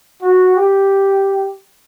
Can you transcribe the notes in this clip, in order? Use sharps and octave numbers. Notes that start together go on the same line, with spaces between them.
F#4
G4